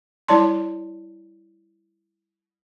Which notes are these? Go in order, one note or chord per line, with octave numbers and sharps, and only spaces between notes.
G3 E4 C#5 D5 A5 C6